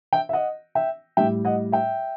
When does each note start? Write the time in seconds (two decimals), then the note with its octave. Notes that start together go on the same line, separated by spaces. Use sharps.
0.13 E5 G5
0.29 E5
0.33 D#5 F#5
0.75 E5 G5
1.17 A2 G3 E5 G5
1.45 D#5 F#5
1.72 E5 G5